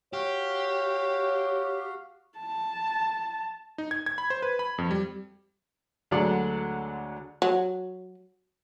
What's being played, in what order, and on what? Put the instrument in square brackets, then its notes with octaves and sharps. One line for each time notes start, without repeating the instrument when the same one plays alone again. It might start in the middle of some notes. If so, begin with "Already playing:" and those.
[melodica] F#4 F5 [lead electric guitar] G4 [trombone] C#5
[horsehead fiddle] A5
[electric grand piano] D#4
G#6
G#6
B5
C5
B4
B5
F2
G3
[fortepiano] D2 D3 F#3 G#3 D5 F#5
[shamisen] F#3